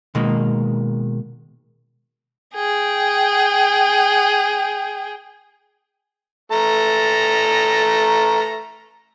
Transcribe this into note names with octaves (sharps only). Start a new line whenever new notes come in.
B2 D#3 G#3 A#3
G#4 G5
A3 A#5